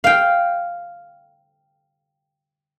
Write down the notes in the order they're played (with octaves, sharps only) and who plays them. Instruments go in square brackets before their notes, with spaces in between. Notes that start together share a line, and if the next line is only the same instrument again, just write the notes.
[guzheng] F5 G5